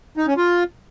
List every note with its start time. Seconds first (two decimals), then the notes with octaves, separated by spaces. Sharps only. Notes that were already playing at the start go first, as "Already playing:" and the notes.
0.17 D#4
0.27 C#4
0.37 F4